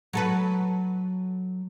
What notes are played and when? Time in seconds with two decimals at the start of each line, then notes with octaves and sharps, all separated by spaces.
0.13 F#3 A4 B4